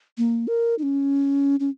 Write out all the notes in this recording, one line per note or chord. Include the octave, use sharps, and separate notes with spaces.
A#3
A#4
D#4
C#4
C#4